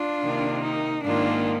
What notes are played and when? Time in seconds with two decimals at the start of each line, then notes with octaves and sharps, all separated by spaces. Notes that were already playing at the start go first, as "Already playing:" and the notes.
Already playing: D4 F4
0.23 C3 D#3 A#3
0.64 D#4
1.05 G#2 D#3 A#3 D4 F4